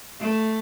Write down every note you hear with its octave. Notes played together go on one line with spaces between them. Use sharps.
A3